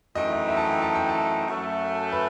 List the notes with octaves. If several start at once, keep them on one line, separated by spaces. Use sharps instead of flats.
F#2 E3 A3 C4 D#4 D#5
D#5
E5
A5
G5
A5
G5
A5
F#2 F#3 A3
B4